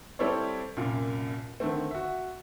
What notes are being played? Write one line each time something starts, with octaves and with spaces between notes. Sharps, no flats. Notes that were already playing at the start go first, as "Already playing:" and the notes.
G3 C4 E4 A4 C#5 D5
C2 F#2 A#2
D3 D#3 A3 C4
F#4 E5